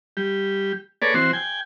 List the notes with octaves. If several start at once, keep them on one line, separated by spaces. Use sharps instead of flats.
G3 G4
A#3 G#4 A4 B4 C#5 D5
E3 C4 F#4 C5
G5 G#5